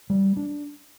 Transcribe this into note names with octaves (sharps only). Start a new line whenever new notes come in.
G3
D4